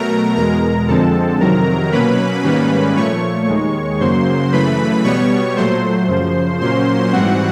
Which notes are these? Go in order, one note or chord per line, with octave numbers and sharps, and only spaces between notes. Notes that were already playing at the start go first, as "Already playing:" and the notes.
Already playing: B2 F#3 A3 A#4 A#5
E2 B2 G#3 A#4 A#5
F2 D3 F3 G#3 C4 A4 A5
F2 C3 D#3 F#3 A#4 A#5
B2 F#3 A#3 C#4 B4 B5
G#2 D#3 G3 A#3 C#4
A#2 F3 A3 C#5 C#6
D#2 D#3 G#3
F#2 C#3 F#3 A#3 C5 C6
F#2 C#3 E3 A3 B4 B5
B2 G3 B3 C#5 C#6
A#2 F#3 A3 C5 C6
F#2 C#3 F3
A#2 F#3 A#3 C#4 C5 C6
G#2 E3 G3 C4 F#4 F#5